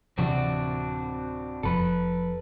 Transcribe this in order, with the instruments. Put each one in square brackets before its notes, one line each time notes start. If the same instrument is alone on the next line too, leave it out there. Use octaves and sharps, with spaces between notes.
[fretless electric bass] D1 C3 E3 [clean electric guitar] C4 D4 F#4
[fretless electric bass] F1 F2 [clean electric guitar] A4 B4